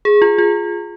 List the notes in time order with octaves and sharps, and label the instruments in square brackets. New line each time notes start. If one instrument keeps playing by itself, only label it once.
[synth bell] G#4
F4
F4